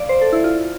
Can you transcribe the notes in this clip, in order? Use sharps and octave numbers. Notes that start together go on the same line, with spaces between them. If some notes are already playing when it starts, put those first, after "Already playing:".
Already playing: D5 F5
C5
A4
E4
F4